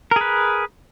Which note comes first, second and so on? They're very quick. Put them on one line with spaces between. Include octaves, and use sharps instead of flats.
A#4 G#4 B4